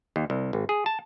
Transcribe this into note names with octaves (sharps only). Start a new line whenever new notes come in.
D#2
C2
G#1
G#4
A5